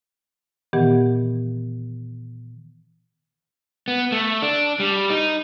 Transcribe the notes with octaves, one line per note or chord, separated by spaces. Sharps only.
A#2 D#3 E3 B3 G4 F#5
B3
A3
D4
G3
D#4